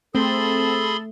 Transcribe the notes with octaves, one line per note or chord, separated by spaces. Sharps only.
A3 C4 G#4 A4 B5 C6